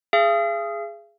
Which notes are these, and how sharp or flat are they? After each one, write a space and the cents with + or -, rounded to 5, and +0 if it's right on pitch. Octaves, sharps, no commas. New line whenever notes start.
G#4 +0 F5 -45